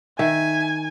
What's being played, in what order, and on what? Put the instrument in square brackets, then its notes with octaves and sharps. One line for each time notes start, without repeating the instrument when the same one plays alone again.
[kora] D#3 [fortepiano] E5 [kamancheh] G#5